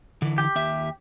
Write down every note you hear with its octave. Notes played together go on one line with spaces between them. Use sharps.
D3 E3
G4
D#2 E5